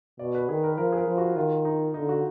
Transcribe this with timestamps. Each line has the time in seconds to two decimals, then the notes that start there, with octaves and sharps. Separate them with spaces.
0.19 B2 D5
0.35 B4
0.49 D#3 G#4
0.64 A#4
0.78 F3 A#4
0.92 G#4
0.98 A#4
1.08 F3
1.18 F#4
1.36 D#3 F4
1.65 D#4
1.94 D3 D#4
2.09 F#4